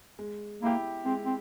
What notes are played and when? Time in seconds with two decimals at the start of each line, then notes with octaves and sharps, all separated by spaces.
0.19 G#3
0.62 A#3 E4 G4
1.05 G#3 C4
1.26 C4